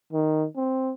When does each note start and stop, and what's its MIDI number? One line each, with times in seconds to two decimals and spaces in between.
0.13 0.45 51
0.56 0.92 60